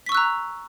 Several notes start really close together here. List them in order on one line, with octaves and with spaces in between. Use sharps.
B6 C#6 E6 F#6 A#5